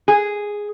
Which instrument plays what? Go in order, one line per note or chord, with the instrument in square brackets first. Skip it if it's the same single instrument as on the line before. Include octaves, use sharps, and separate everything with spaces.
[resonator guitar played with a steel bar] G#4